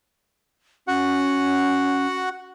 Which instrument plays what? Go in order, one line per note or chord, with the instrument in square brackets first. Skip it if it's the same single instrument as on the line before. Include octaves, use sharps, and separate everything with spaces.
[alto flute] C#4 [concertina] F#4 F#5